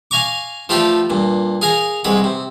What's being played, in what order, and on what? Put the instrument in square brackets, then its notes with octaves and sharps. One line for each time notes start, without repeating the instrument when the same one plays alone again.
[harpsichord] F5 G#5 A#5 C#6 D6
F3 A3 F4 G4 B4 D5
G2 A#2
G#4 A#4 F5 G#5 A#5
C2 G#3 B4 F#5
C3